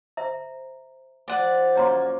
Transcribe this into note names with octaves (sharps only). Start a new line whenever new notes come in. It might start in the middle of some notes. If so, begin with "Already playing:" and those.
C5 E5 A#5
F3 D5 F#5
F#2 A#3 C#5 A#5 C6